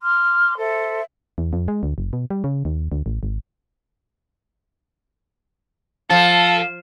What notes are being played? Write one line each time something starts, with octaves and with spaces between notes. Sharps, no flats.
C6 D6 F6
A4 C5 E5
E2
F2
G#3
D2
F#1
B2
G3
C#3
D#2
D2
A1
G#1
F3 A4 F5 A5